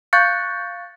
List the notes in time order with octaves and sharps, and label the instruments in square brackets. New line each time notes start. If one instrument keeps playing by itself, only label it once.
[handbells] F5 C#6 F#6 G6 A6 C#7